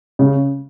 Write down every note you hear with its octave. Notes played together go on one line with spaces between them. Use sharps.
C#3